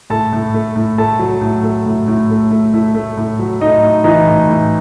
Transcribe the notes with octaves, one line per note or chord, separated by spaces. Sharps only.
A2 A4 A5
A2
A3
A2
A3 A4 A5
F#3
A2
A3
A2
A2
A3
A3
A3 E4 E5
A3
A2
F#3
A2 D#4 D#5
A2
E3 D#4 D#5
A2
A2